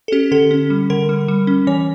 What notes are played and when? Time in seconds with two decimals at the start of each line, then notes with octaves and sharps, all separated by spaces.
0.08 A4
0.12 C#4 G4
0.31 D3 A4
0.51 C#4
0.70 G3
0.90 D3 A#4
1.09 G3
1.28 G3
1.47 C#4
1.67 E3 C#5